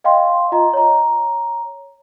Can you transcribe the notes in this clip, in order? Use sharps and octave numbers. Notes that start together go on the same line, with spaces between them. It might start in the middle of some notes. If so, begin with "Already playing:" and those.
D#5 F5 G5 C6
F4 D#5 A#5
C#5 A#5